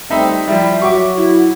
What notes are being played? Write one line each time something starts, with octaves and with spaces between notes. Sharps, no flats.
G3 A3 C4 D#4 E5 B5
F3 G3 E4 G4 E5
F#3 F#4 C#6 D6
E4